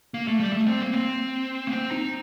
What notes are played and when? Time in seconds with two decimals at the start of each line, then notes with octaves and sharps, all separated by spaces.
0.14 A#3
0.28 A3
0.40 G3
0.53 A3
0.66 C4
0.80 A#3
0.93 C4
1.67 A#3
1.71 C4
1.91 D#4